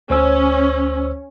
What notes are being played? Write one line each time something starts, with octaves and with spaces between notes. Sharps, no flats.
D2 C#4 C5 E6